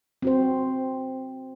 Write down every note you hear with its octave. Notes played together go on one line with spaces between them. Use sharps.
C4 F#4 C5